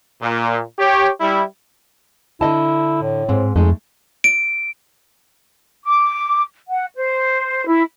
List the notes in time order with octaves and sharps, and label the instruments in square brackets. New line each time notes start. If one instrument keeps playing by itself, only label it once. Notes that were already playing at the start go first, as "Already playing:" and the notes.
[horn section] A#2
G4 C#5
G3 E4
[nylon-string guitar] D3 D#5 A5 [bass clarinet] E4
[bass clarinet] A2
[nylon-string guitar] G#2 C4
[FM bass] F2 [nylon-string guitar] G#3 D#4 A4 [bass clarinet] A3
[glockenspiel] D7
[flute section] D6
F#5
C5
E4